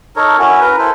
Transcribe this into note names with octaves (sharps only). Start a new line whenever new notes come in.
D#4 A4 A#4 C#5
C#4 E4 F#4
A#4 B4
E4 A4 C5